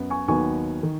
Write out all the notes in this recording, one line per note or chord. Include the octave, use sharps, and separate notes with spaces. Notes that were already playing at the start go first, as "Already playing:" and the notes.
Already playing: F#2 B3
G#5 C#6
D#2 D#3 F#3 B3 G#5 C#6
D#3